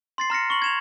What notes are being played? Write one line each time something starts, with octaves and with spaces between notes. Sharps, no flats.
C6 A6 C7
A#5 F6 A#6 C#7
C#6 F#7
G#6 E7 F7